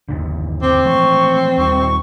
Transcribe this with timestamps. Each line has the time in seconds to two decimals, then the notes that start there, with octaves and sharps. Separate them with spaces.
0.09 G1 D#2 D3
0.62 C4 D6
0.85 E3 F3 A3 C#6
1.58 D#2 G3 C#6